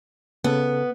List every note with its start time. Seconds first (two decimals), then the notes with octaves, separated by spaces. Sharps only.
0.44 C#3 B3 A4